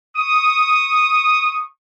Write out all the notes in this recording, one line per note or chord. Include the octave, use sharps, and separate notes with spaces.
C#6 D#6